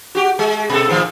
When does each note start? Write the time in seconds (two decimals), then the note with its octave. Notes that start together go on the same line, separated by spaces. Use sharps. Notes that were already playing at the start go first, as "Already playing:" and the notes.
0.15 F#4 G4
0.39 G#3
0.70 B2 A4
0.89 A2 D#3 F3